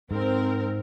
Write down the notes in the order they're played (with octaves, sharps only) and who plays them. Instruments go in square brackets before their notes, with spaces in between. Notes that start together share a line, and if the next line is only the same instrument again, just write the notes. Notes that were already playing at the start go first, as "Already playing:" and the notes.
[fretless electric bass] G#2 [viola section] C4 A#4